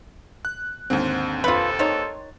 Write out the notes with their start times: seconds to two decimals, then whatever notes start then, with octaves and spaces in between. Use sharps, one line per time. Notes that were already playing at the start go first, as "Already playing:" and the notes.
0.45 F#6
0.90 D#2 G#2 D3 C4
1.44 A#1 F2 F4 A4 B4
1.79 D#3 D#4 C#5 C6 A6